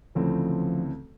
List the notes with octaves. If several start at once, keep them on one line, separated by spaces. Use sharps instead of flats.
D2 C#3 E3 F3 A3 C4